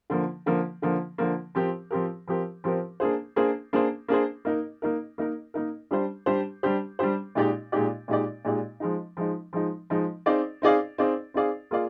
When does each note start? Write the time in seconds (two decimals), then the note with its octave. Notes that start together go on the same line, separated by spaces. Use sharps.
0.10 D3 F3 A#3
0.46 D3 F3 A#3
0.82 D3 F3 A#3
1.18 D3 F3 A#3
1.55 F3 C4 G4 A#4
1.91 F3 C4 G4 A#4
2.28 F3 C4 G4 A#4
2.64 F3 C4 G4 A#4
3.00 A#3 D4 G#4 C5
3.36 A#3 D4 G#4 C5
3.73 A#3 D4 G#4 C5
4.08 A#3 D4 G#4 C5
4.45 A#3 D#4 A#4
4.82 A#3 D#4 A#4
5.18 A#3 D#4 A#4
5.54 A#3 D#4 A#4
5.91 G3 D4 G4 C5
6.26 G3 D4 G4 C5
6.63 G3 D4 G4 C5
6.99 G3 D4 G4 C5
7.35 A#2 G#3 D#4 G4 D5
7.72 A#2 G#3 D#4 G4 D5
8.08 A#2 G#3 D#4 G4 D5
8.45 A#2 G#3 D#4 G4 D5
8.80 F3 G#3 D#4
9.17 F3 G#3 D#4
9.53 F3 G#3 D#4
9.90 F3 G#3 D#4
10.26 C4 D#4 G#4 D5 F5
10.62 C4 D#4 G#4 D5 F5
10.98 C4 D#4 G#4 D5 F5
11.34 C4 D#4 G#4 D5 F5
11.71 A#3 F4 G#4 D5 F5